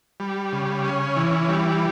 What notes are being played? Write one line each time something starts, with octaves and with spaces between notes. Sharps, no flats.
G3
C#3
C#4
E3
G3